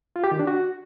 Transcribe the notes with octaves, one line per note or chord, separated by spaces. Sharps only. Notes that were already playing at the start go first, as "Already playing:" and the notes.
F4
G4
D#3
D4
F#4